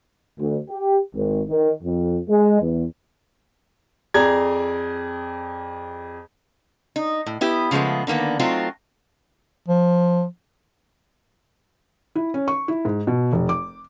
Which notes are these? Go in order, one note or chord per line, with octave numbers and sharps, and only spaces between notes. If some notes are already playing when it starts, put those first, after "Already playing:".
D2
G4
G#1
D#3
F2
G#3
E2
F2 G#4 D5 A#5 G#6
D#4
A2
B3 E4 G4 B4
C#3 F3 G#3 A3 B3
D3 D#3 A#3 B3
F#3 A3 C4 D#4 F4
F3
E4
C#4
C#6
E4
G#2
B2
F1
D6